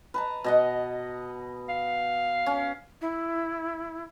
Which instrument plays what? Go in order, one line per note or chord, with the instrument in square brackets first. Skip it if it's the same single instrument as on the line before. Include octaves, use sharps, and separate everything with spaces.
[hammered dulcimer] B4 A5 A#5
B2 D#5 F#5
[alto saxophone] F5
[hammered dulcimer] C#4
[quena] E4